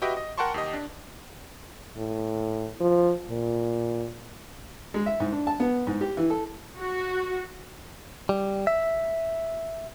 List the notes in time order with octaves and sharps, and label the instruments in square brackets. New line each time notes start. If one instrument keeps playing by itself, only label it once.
[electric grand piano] F#4 G4 B4 D#5 E5 G5
D#5
A#4 F#5 G5 A5 C6 C#6
D#2 G4 D#5
D4
[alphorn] A2
F3
A#2
[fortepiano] G#3
E5
G#2
D4
A5
B3
G#2
G4
E3
A4
[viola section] F#4
[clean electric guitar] G3
E5